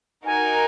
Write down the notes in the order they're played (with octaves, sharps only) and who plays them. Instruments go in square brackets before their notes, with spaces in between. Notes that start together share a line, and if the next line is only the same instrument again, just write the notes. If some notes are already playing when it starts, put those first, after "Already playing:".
[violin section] D#4 F#4 A#4 [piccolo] G#5